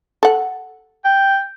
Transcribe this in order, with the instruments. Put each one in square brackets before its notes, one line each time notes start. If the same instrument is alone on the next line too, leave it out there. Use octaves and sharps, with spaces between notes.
[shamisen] A4 F#5
[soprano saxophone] G5